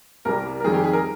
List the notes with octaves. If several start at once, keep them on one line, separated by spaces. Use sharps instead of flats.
C2 C3 G3 A#4
A#4
F2 D#3 G3 G#4
G4
G#4
A#4